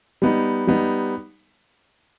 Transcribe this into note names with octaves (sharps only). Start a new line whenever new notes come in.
G3 B3 D#4
G3 B3 D#4